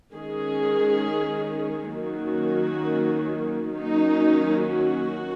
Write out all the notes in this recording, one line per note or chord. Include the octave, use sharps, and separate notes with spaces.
D#3 G#3 C#4 G#4
D#3 F#3 A#3 C#4 F#4
D#3 F#3 A#3 C#4 D#4
F#4